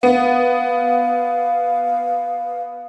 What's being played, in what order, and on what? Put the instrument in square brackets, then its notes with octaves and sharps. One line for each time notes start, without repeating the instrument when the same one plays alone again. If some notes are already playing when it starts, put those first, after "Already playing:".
[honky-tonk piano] B3 [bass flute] F5